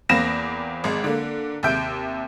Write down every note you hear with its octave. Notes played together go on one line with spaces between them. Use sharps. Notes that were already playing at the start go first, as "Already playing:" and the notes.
E2 A#3 C4 B5 A#6 E7
G#1 G#3
D3 A#3
D#2 C3 E5 G6 D7